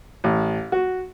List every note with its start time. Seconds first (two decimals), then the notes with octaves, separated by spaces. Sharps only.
0.24 A1
0.72 F#4